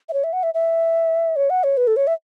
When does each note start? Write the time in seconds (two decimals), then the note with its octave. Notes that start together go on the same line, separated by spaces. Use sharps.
0.09 E5
0.13 C#5
0.24 E5
0.33 F#5
0.43 E5
0.54 E5
1.36 C#5
1.50 F#5
1.64 C#5
1.77 B4
1.87 A4
1.96 C#5
2.07 E5